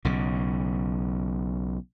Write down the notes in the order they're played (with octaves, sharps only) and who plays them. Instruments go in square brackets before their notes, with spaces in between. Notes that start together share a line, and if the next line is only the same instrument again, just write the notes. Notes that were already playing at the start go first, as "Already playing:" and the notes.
[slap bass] B1 C#3